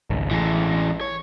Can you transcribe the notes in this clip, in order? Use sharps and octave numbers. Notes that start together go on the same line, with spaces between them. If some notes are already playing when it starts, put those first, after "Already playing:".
G#1 C#2
A1 E3 G#3
C#5